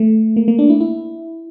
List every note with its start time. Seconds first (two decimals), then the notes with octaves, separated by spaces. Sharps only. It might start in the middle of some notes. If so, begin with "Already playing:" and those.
Already playing: A3
0.37 A#3
0.48 A#3
0.59 D4
0.70 E4
0.81 E4